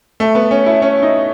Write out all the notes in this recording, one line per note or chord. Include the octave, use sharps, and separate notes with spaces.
A3
B3
C#4
E4
C#4
D#4